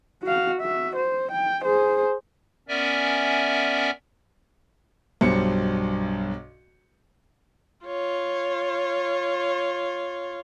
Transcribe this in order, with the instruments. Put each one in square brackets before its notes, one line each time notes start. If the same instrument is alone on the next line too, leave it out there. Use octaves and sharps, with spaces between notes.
[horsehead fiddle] F#4 F5
F#4 E5
C5
G5
G#4 C5
[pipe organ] B3 C#4 A#4 D5 E5 G#5
[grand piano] B1 G2 B2 D4 C5 C#7
[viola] F4 C#5